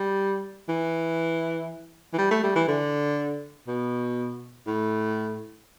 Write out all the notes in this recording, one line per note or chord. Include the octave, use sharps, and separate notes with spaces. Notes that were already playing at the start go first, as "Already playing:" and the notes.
Already playing: G3
E3
E3
G3
A3
G3
E3
D3
B2
A2